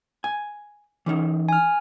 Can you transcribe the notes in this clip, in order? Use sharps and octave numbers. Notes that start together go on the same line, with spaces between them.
G#5
E3 C#4 D#4
G#5 F6